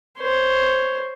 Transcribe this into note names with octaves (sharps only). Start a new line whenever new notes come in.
C5 C#5